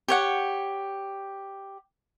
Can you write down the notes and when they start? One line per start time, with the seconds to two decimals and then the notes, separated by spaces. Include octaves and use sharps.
0.08 G4 C#5 F#5